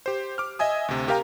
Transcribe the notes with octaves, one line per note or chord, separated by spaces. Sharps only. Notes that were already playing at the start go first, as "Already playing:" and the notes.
G4 C5
D6 F6
D#5 E5 G#5 D#6
D2 C3
G4 A#4 F5 G5 A#5